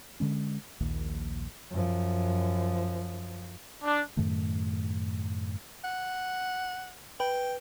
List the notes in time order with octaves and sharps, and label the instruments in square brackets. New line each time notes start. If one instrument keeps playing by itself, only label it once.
[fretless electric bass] D3 G#3 C#4
A#1 D#2 A#2
[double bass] F#2 F3
[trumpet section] D4
[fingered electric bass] F#2 A2 D#3 A3
[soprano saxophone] F#5
[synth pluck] B4 [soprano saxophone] G5